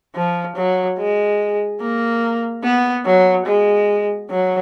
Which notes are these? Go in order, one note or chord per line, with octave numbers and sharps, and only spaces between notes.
F3
F#3
G#3
A#3
B3
F#3
G#3
F#3